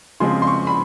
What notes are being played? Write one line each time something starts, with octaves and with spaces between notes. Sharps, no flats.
C#3 F3 G#3 C4 C6
C6
C#6
B5